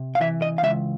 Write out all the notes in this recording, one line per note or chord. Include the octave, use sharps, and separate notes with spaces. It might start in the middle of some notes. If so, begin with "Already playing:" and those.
Already playing: C3
F5
E3 E5
D#5
F5
C#2 E5